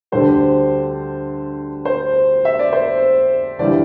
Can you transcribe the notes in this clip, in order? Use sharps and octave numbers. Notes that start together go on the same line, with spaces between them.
D2 D3 G3 C5
C5
E5
D5
C5
G1 E3 G3 D5